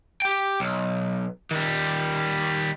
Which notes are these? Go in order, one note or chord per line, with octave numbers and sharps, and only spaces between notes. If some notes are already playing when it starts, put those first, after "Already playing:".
G4 G5
B1
D#3 G3